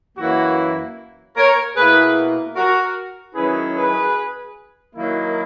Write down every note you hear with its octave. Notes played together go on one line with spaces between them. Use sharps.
F#2 E3 A#3 E4 F#4
A#4 C#5
B2 A#3 E4 G#4 B4
F#4 A#4
D#3 F#3 C#4 E4 G#4 B4
G#4 B4
D#3 F#3 A#3 E4